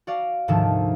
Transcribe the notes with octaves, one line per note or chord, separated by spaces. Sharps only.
F#4 D5 F5
D2 G#2 C3 D#3 F3 A4